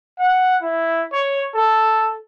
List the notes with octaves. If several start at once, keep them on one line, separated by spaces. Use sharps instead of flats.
F#5
E4
C#5
A4